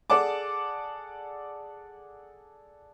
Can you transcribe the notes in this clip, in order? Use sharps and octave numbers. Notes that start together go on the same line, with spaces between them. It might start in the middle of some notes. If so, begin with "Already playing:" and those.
G#4 A4 D5 F#5 A5 D6